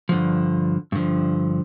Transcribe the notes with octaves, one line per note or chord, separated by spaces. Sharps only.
G2 D3 F3
G2 D3 F3